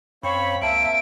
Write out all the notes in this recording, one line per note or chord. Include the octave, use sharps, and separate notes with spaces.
F#2 C4 C#5 F5 B5
C#2 A#3 C4 E5 A5 D7